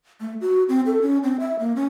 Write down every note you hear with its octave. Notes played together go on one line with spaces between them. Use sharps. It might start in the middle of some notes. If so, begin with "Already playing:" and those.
A3
F#4
C4
A4
C#4
C4
E5
A#3
C#4